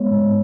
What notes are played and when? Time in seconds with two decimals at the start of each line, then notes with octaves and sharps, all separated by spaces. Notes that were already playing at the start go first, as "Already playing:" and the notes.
Already playing: G#3 B3 C#5
0.11 G#2